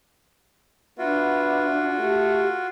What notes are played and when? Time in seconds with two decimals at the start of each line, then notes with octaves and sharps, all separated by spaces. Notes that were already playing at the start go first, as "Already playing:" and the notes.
0.98 B3 D4 F4 F#4 E5
1.99 A3 G4